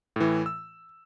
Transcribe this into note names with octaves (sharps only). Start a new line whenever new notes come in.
A2 E3
E6